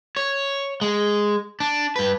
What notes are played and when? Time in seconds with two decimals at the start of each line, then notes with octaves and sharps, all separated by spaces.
0.17 C#5
0.81 G#3
1.60 D4
1.96 G2 B4